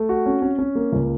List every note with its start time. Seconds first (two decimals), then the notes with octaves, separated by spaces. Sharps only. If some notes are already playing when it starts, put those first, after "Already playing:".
Already playing: A3
0.09 F#4
0.26 C#4
0.42 C#4
0.59 C#4
0.75 A#3
0.92 C#2